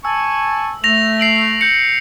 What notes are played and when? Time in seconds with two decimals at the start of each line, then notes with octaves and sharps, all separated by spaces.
0.05 G#5 A5 C#6 E6
0.84 A3 A#6 F7
1.20 C7 D7 F#7
1.61 G6 C#7